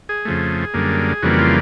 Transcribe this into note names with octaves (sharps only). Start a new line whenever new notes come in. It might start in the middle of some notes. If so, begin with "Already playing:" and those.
G#4
F2 C#3 F3 A3
F#2 D3 G3 A#3
F2 C#3 E3 G3 A#3 F#4
F4